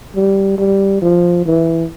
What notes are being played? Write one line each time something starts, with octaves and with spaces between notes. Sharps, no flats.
G3
G3
F3
E3